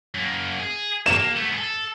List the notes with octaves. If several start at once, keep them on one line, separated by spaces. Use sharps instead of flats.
F#2 A#3
G#4
A#3 E7
A3 B3
G#4 A4